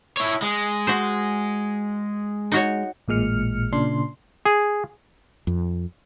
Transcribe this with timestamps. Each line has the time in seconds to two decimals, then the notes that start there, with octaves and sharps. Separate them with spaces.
0.17 E4 C#5
0.42 G#3
0.87 F#4 C5
2.52 D#4 F#4 C#5
3.08 A1 A#2 G#3 F6 C#7
3.72 A#2 C#3 D4 C6
4.45 G#4
5.47 F2